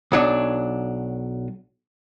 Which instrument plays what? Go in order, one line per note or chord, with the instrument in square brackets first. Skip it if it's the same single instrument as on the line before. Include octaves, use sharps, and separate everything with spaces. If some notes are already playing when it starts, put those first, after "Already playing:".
[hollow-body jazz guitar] B1 F#3 D4